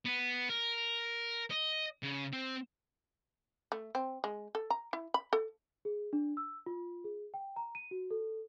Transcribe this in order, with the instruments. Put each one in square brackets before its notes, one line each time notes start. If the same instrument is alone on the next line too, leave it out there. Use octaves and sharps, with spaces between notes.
[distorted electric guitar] B3
A#4
D#5
C#3
C4
[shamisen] A3
C4
G#3
A4
A#5
E4
B5
A4
[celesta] G#4
D4
E6
F4
G#4
G5
A#5
D#7
F#4
A4